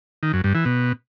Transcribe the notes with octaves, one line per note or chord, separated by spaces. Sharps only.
D#3
F#2
G2
E3
B2